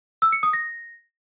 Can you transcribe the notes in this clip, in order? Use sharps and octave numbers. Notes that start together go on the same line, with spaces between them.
E6
C#7
D#6
A#6